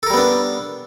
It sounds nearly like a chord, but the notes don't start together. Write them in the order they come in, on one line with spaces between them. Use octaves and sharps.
A4 A#4 G3 B3 D4